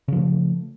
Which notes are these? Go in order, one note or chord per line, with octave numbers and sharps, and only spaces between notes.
C#3 F3 A3